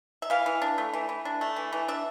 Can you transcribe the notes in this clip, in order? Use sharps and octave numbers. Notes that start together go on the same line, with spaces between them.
E5
E3 F5
E3
D4
A3
E3
E3
D4
A3
E3
E3
D4 E5